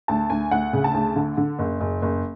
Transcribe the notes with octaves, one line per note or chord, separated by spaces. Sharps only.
D2 A5
D2 G#5
D2 F#5
C#3
A5
D2
D3
D3
F#1
F#1
F#1